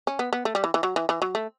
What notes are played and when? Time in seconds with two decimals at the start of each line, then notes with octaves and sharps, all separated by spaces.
0.07 C#4
0.19 B3
0.33 B3
0.45 A3
0.55 G3
0.64 E3
0.74 E3
0.83 F#3
0.96 E3
1.09 E3
1.22 F#3
1.35 A3